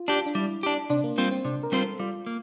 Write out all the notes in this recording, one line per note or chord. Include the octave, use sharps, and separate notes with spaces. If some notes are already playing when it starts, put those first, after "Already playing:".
Already playing: F4
D4 G4
D4
G3 E4
D4 G4
C3 D4
A#3
G3 A#3 C4 F4 C5
C4
C3 D4
A#4
G3 C4 F4 C5
A4
G3 F4
A#3